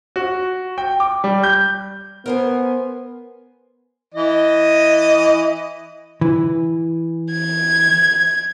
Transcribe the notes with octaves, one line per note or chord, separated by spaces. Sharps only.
F#4
G5
D6
G3
G6
B3 A#4 C5 G#5
E3 D#5
E3
G#6